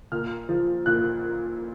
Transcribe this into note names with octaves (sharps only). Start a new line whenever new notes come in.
A#2 F6
F3
A#2 F#6